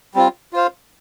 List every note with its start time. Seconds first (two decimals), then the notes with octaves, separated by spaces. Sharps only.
0.14 G3 C4 F4
0.53 F4 C5 F5